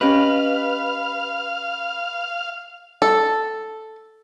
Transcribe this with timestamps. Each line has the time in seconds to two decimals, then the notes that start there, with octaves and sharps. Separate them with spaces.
0.01 C#4 G4 B4 D#5 F5
3.02 A4